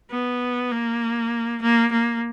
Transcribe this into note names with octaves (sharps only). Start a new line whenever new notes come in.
B3
A#3
A#3
A#3